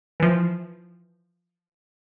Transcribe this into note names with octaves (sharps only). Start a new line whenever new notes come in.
E3 F3